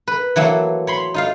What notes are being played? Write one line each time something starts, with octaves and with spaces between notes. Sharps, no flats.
B4
E3 F#3 A3 A#3
C#5 B5 C6
D#4 F4 F5